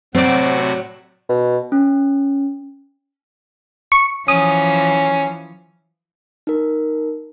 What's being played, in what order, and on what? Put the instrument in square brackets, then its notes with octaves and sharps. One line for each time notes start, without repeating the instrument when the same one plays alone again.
[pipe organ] A2 C3 F#4 [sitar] F#3 D5 [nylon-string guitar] C4
[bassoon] B2
[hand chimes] C#4
[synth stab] C#6
[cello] E3 F3 [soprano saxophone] C#4 [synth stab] D#6
[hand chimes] D#4 A#4